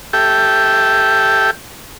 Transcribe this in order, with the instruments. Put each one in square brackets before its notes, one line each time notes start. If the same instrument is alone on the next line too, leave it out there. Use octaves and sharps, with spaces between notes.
[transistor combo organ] G4 A4 E5 G5